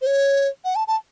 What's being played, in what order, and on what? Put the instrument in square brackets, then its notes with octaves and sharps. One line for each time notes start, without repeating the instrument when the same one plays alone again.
[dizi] C5
C#5
F#5
A5
A5